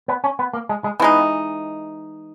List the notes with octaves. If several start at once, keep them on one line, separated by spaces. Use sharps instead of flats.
B3
C#4
B3
A#3
G#3
G#3
E3 G#3 B3 D#4